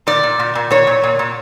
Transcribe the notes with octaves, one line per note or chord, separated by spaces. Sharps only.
A#2 D5
A#2
A#2
A#2
A#2 C#5
A#2
A#2
A#2